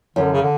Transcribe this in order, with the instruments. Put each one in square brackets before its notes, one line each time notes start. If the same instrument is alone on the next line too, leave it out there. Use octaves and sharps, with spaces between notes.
[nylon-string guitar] F#2 [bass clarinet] D3
[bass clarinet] C#3
D3